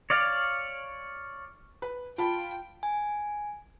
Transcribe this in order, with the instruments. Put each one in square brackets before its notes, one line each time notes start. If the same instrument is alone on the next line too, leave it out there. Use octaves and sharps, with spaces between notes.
[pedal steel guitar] C#5 D5 F5
[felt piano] B4
[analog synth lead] F4 [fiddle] G5 [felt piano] A5 B5
[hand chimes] G#5